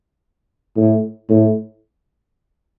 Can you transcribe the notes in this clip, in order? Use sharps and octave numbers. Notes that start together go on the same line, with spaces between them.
A2
A2